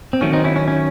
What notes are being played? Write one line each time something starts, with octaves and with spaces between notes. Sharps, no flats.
C4
D#3 F#3 A3 C#4
C4 D#4
C#4 E4
C#4
C#4